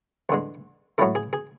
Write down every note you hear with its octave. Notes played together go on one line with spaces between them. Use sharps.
E2 D3 G#3
A2 F#3 A3 E4 A4
G#4
G#4